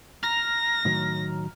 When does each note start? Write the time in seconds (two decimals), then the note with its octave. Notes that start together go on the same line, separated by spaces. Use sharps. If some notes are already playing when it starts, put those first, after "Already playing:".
0.23 A#5 F6 A#6
0.85 A2 D#3 F#3